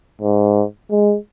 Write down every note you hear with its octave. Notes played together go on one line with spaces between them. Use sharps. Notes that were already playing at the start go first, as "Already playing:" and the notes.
G#2
G#3